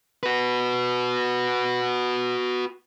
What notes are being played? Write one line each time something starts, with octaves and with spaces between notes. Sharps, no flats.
F#4 B4